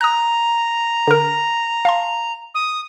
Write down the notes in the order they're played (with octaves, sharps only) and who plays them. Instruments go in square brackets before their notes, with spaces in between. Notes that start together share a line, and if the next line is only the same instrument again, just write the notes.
[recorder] A#5 [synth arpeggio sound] D#6 F#6
[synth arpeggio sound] D3 A#4
F5 A5 C6
[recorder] D#6